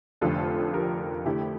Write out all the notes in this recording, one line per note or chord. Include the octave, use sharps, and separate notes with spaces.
F1 F2 D3 F3 A3 F4 A4
G4 A#4
F2 D3 A3 E4 G4